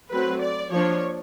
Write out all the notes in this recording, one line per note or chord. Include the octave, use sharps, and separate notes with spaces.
F#3 A3 C4 B4
D5
F3 A#3 D4 C#5